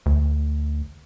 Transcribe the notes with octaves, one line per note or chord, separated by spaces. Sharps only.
D2